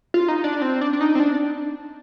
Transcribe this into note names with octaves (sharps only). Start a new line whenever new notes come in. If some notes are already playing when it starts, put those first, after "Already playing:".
F4
D#4
D4
C4
D4
D4
D#4
C4
D4